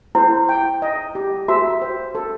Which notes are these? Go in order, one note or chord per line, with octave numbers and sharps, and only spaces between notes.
E4 C5
G5
D#5
G4
F#4 E5
C5
A4